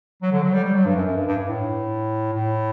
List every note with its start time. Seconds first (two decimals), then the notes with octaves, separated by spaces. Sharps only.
0.22 F#3
0.32 D3
0.43 F#3
0.54 G3
0.64 G3
0.75 F#3
0.86 G2
0.96 F#2
1.06 F#2
1.16 G2
1.27 G2
1.38 G2
1.49 A2
2.33 A2